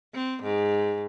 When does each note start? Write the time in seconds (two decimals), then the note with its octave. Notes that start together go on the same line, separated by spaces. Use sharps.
0.14 C4
0.43 G#2